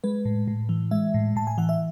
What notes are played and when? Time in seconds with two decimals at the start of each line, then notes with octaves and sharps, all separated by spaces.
0.04 G#3 B4
0.25 A2
0.48 A2
0.69 E3
0.91 G#3 E5
1.14 A2
1.36 A2 A5
1.47 G#5
1.58 E3 F#5
1.69 E5